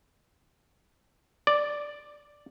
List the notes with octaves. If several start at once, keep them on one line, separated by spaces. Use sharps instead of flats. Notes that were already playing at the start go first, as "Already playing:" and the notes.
D5